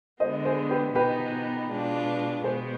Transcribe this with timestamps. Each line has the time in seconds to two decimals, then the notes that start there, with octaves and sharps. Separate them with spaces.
0.20 D3 G#3 B3 C5 D#5
0.45 G#4 C5
0.70 G4 B4
0.95 B2 B3 D#4 G4 B4
1.69 B2 G#3 D4 F4
2.44 B2 G#3 B3 G#4 C5